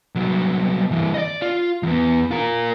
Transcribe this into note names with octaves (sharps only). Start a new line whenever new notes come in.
C2 F#3
G2 E3
D5 D#5
F4
E2 B3
F4 A#4